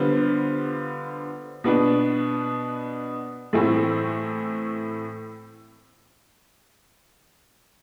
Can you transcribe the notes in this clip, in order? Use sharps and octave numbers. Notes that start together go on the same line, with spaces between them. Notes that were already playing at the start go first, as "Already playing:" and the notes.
Already playing: D3 G3 B3 F4 C5
B2 B3 D4
A2 E3 A3 C4 E4